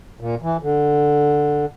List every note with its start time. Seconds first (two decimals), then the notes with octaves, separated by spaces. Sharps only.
0.20 A#2
0.42 E3
0.63 D3